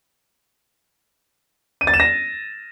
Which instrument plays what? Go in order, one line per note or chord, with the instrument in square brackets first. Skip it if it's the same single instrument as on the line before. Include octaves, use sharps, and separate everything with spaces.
[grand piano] D#7
A6
E7
A#6